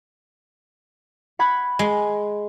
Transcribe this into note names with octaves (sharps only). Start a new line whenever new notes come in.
F#5 B5 G#6
G#3